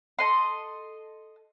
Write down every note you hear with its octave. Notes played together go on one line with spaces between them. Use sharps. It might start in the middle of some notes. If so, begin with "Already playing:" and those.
A4 D#5 C6